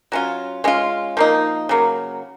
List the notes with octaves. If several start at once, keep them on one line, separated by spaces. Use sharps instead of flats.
F#3 C#4 F4
G#3 C#4 F4
F3 A#3 D#4
C#3 F#3 A#3